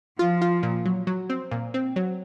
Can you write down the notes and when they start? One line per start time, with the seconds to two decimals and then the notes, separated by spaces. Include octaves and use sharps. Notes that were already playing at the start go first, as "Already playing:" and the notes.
0.19 F3 F4
0.42 F4
0.63 A#2
0.85 F#3
1.07 F#3
1.30 C4
1.51 A#2
1.74 C4
1.96 F#3